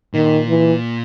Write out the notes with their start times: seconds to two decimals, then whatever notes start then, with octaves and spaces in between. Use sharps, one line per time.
0.14 A#2 D#3
0.48 E3